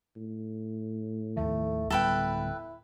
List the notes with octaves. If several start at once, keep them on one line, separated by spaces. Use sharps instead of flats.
A2
D#2 D#3 F3 A3
D1 G3 B3 E4 A4 B4 G5